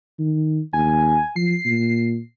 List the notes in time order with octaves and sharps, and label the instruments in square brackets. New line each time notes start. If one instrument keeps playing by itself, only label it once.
[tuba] D#3
[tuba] D#2 [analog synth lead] G#5
[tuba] F3 [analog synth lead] C7
[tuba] A#2